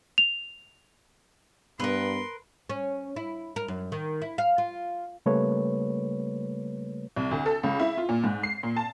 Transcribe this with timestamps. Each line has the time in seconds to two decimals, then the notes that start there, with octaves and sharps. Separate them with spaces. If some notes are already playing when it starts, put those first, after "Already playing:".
0.18 F7
1.80 G2 B3 A#4 B4 C6
2.70 C#4
3.16 E4
3.56 A#4
3.68 F#2
3.92 D#3
4.22 E4
4.38 F5
4.58 F4
5.26 C#3 G3 A3 A#3 B4 C#5
7.16 C2
7.31 D2
7.46 A4
7.63 C#2
7.79 E4
7.97 F4
8.09 A#2
8.24 G#2
8.43 C7
8.63 A#2
8.76 A5